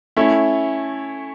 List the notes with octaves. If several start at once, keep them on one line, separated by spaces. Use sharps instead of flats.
A3 C#4 E4